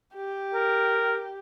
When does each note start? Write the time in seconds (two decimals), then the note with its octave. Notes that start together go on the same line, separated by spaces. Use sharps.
0.15 G4
0.54 A#4